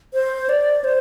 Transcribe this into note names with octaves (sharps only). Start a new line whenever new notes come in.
C5
D5
C5